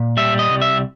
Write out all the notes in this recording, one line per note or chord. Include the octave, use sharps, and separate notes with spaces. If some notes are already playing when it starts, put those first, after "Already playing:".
Already playing: A#2
G3 E5
D#5
C2
E5